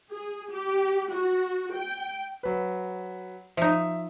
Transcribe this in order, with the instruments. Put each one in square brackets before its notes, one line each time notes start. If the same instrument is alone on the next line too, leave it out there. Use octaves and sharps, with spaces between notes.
[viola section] G#4
G4
F#4
G5
[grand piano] F#3 B4
[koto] F3 D#4 [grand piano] E5